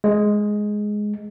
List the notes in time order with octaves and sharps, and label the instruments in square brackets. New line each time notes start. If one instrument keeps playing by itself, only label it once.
[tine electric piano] G#3